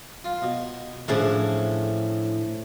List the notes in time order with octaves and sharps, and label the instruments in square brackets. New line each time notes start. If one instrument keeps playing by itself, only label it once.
[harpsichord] F4
B2
[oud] A2 D4 G#4 [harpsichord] E3 F3 C#4